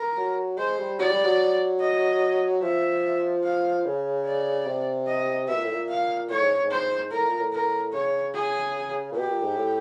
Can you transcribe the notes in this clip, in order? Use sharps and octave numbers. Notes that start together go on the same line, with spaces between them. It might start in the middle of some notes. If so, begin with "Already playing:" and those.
Already playing: A#4
F#3
G#3 C5
G3
F#3 D5
G3
F#3
D#5
F3 E5
F5
C#3
D5
C3
D#5
B2 E5
A#2
A2
A#2
F5
A2 C#5
G#2
G#2
C5
A2 A#4
A#2
A2
A#4
C#3 C#5
G#4
A#2
B2 G4
A#2
G#2
A2